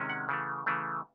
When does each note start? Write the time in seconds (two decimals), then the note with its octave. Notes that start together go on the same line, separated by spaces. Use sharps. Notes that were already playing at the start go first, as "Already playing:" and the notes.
Already playing: C3 D#3 G#3 C#4
0.10 F#5
0.29 C#3 E3 A3
0.66 C#3 E3 A3